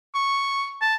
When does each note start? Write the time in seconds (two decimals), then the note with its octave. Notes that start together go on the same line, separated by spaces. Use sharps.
0.15 C#6
0.81 A5